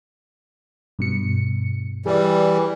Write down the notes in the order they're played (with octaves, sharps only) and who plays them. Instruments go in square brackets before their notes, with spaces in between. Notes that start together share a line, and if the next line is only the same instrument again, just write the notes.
[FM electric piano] G2 B2 C#7
[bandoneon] E3 G3 [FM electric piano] G#4 D5